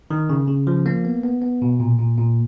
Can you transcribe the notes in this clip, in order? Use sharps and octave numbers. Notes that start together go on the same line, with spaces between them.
D#3
C#3
C#3
F3
A#3
B3
B3
B3
B2
A#2
A#2
A#2